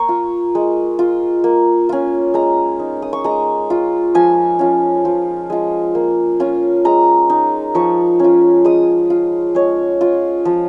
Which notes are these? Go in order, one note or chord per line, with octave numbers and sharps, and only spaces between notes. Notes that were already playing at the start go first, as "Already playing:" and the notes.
Already playing: A#3 A#5 C#6
F4
G#3
F4
A#3
C#4 F4
G#3 A#5
D#4
D#6
C#6
G#3 A#5
F4
F3 G#5
C#4 F4
F3
G#3 F4
A#3
C#4 F4
G#3 A#5
D#4
F3 C#6
C#4 F4
G#3 D#6
F4
G#3 C#5
F4
F3